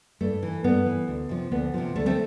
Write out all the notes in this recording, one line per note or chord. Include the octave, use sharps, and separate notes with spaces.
G2 A3
E3
G2 B3
E3
D2
C3 F3
D2 B3
C3 F3
D2 A3
A3 C4